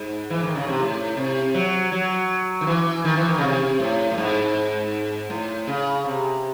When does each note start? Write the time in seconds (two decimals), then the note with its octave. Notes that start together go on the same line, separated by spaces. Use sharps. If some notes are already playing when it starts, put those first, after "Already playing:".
Already playing: G#2
0.30 E3
0.43 D#3
0.55 C#3
0.67 C3
0.79 A2
1.17 C3
1.54 F#3
1.92 F#3
2.61 D#3
2.67 E3
3.05 D#3
3.16 E3
3.28 D#3
3.38 C#3
3.43 C3
3.80 A2
4.11 A2
4.18 G#2
5.30 A2
5.67 C#3
6.05 C3